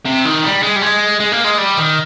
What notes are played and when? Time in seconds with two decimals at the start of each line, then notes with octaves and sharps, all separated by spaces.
0.05 C3
0.25 D#3
0.43 G3
0.63 G#3
0.76 G3
0.82 G#3
1.20 G#3
1.32 A#3
1.44 G#3
1.58 G3
1.77 D#3